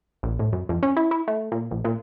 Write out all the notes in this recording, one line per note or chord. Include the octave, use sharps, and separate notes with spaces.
A#1
A2
F#2
F2
C#4
E4
E4
A3
A#2
A#1
A#2